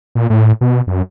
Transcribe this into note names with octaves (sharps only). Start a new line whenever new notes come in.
A#2
A2
B2
F#2